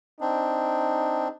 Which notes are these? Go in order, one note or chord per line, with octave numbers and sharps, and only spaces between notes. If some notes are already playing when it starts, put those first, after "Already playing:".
C4 D4 D#4